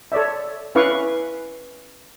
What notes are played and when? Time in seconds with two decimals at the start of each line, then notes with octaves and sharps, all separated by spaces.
0.12 A4 C#5 D5 E5
0.75 C#4 E4 B4 F5 C#6 D6